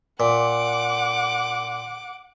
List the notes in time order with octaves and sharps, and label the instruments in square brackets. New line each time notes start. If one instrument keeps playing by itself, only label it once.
[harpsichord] A#2 [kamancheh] F#5 D6